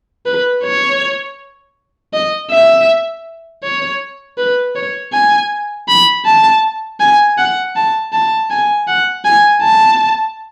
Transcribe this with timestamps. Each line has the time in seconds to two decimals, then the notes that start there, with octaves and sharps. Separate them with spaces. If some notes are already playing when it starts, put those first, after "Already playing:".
0.26 B4
0.64 C#5
2.13 D#5
2.51 E5
3.63 C#5
4.38 B4
4.75 C#5
5.13 G#5
5.88 B5
6.25 A5
7.00 G#5
7.38 F#5
7.76 A5
8.13 A5
8.50 G#5
8.87 F#5
9.25 G#5
9.62 A5